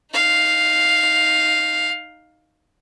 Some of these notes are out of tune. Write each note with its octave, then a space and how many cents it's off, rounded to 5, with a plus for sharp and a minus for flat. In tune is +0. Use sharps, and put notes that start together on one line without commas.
D#4 +0 F5 +0